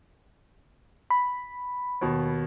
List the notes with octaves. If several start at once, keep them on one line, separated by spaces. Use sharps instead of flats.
B5
D#2 B2